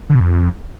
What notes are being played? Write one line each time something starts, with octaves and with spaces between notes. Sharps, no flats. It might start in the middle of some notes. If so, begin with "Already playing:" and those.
D3
B2
F2